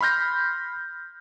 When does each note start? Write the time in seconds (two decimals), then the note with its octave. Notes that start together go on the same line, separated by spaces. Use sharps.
0.01 B5 C6 F6 G6 A#6